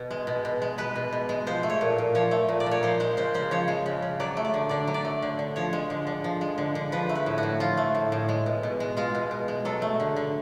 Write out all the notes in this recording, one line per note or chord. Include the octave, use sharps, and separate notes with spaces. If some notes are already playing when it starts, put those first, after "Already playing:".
Already playing: B2
G#3
B2
B2
G#3
G#3 B4
B2
B2
G#3
F3 C5
A3
C#5
A#2
A#2
F3 C#5
A3
A#2
D5
A#2
C#5
F3 C5
G#3 C5
C#3 C5
C#3 C5
F3 C#5
G#3
C#3
C#3
F#3 D5
A3
D5
D3
D3 D5
F#3
D5
A3
D3
D3
F3 C#5
G#3
D3
D3
F3
G#3
D3
D3
F3 B4
A3
B4
A2
F#4
A2
F3 F4
A3
A2
A2
G#3
B2
B2
G#3
G#3 F4
B2
B2
G#3
F#3 A4
A3
D3
D3